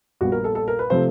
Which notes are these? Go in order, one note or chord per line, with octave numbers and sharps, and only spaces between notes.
A#1 A#2 G3 B3 F#4
A#4
A4
A4
A#4
B4
C3 F3 A3 C4 C5